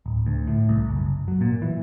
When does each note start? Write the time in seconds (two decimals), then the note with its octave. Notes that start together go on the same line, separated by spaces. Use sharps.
0.06 D1
0.26 D2
0.47 A2
0.69 C2
0.89 F#1
1.28 F#3
1.41 A#2
1.62 E3